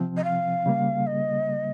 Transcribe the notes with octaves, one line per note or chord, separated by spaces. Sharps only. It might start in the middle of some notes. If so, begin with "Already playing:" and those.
Already playing: C3 F3 C4
D#5
F5
C#3 G3 A#3
D#5